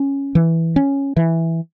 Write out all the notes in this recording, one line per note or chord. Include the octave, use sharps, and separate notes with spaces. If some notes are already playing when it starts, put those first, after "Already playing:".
Already playing: C#4
E3
C#4
E3